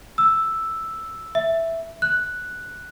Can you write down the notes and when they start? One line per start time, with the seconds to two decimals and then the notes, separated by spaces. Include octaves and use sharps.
0.18 E6
1.35 E5
2.02 F#6